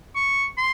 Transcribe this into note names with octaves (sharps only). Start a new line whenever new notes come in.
C#6
C6